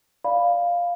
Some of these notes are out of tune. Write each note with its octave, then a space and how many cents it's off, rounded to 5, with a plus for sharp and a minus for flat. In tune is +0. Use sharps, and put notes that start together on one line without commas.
D5 +0 F5 +0 B5 +0